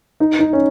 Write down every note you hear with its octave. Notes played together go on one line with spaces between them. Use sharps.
D#4
D#4
C#4